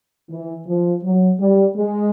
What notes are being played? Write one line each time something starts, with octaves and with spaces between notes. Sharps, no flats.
E3
F3
F#3
G3
G#3